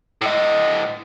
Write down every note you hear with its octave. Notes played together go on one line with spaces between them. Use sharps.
A2 D#5